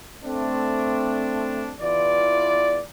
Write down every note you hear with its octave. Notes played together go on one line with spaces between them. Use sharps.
A3 C4 D4
E2 E3 F4 D5